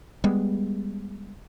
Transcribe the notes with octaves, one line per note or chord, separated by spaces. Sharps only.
G3 G#3 B3